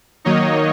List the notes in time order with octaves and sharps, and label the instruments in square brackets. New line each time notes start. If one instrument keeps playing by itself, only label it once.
[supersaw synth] D#3 F#3 A#3 D#4 C#5 D#5